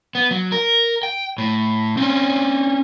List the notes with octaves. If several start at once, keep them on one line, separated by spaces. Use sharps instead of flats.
B3
F#3
A#4
G5
A2
C4 C#4